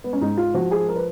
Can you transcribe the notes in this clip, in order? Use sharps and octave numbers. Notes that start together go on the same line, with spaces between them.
B3
C#4
G#2 D#4
F4
F3 F#4
G#4
A#4
B4